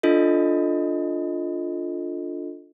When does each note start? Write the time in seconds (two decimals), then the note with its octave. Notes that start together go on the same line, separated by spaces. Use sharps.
0.03 D4 F4 A4 D#5